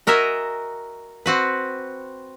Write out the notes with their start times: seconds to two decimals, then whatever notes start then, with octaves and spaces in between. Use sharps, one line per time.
0.07 F#4 A#4 D#5 E5 G#5
1.26 C4 F#4 B4